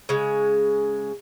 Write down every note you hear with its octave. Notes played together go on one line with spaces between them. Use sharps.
C#3 G#3